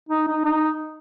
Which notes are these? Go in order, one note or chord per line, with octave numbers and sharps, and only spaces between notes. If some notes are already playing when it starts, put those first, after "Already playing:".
D#4
D#4
D#4